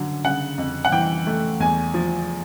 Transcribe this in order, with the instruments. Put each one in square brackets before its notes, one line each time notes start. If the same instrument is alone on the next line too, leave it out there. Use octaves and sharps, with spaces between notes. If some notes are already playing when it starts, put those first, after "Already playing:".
Already playing: [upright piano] F#2 D3 F#3
C#3 F#5
F2
F#5
E3 G5
A3
E2 G#5
F3